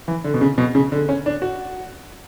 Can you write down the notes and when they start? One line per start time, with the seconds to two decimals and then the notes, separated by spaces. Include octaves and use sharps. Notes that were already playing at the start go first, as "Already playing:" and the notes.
0.08 E3
0.24 D3
0.34 B2
0.41 C#3
0.58 B2
0.75 C#3
0.92 D3
1.09 C#4
1.26 D4
1.42 F#4